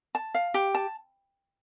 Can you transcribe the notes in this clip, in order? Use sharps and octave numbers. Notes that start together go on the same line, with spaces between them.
A5
F5
G4
A5